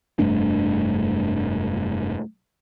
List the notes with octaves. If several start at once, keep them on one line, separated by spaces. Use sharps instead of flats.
F1 G2 A3 D4